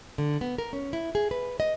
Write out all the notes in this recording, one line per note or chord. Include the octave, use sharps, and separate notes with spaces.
D3
B3
A#4
C#4
E4
G#4
B4
D#5